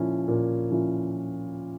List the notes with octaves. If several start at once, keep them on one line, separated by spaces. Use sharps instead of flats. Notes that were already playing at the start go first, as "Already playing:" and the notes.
Already playing: A#2 F3 C#4 E4
A#2
F3 C#4 E4